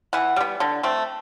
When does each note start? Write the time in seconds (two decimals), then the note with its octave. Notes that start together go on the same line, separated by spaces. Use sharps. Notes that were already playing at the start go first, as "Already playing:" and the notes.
0.13 E3 F#5
0.36 G3 B3
0.60 D3
0.83 A3 C4